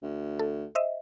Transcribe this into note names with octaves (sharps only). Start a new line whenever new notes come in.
D2
A4
C5 D#5 E5